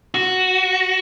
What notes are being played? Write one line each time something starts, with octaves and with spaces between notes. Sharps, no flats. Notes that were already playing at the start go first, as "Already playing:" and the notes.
F#4